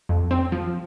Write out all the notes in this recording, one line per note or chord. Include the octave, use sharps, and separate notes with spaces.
F2
C4
F3